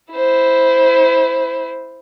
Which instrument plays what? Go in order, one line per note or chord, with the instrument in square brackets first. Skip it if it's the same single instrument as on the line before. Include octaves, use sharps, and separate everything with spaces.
[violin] E4 C5